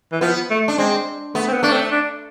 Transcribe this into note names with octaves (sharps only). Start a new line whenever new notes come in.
E3
F3 B3
A3
D4
G#3 C4
A3 B3
C4
B3
A3 D4
C4
D4